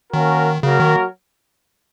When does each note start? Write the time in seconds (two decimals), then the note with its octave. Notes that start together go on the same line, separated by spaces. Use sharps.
0.13 D#3 A#3 C#4 F#4 A#4
0.63 C#3 F#3 A#3 F#4 A#4 C#5
0.80 D#3